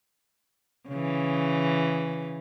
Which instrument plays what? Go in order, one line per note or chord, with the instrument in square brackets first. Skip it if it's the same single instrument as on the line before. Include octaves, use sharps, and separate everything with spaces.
[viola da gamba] C#3 E3